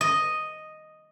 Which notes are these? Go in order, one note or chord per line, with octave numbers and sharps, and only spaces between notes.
D#5